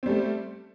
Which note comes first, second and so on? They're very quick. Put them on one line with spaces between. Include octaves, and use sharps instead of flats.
C4 G3 A3